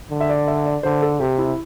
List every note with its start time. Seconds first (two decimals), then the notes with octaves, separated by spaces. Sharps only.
0.11 D3
0.20 E5
0.29 D5
0.47 E5
0.66 D5
0.83 D3 C5
1.02 A4
1.20 C3 G4
1.38 E4